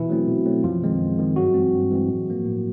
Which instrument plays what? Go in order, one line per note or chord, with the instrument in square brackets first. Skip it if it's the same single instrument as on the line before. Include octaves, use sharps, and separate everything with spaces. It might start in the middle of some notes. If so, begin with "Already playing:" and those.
Already playing: [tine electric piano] B2 E3 E4
F#3 A3 C4
B2
F#3 A3 C4
F#2 F3 F4
D#3 G#3 C4
F#2
D#3 G#3 C4
G2 F#3 F#4
E3 G#3 C4
G2
E3 G#3 C4
A2
F3 A#3
A2